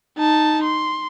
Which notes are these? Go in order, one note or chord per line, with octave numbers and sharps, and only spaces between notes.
D#4 A5
C6